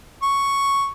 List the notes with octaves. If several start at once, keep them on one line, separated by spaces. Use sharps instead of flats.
C#6